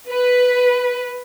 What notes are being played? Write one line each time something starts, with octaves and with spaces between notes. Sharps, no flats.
B4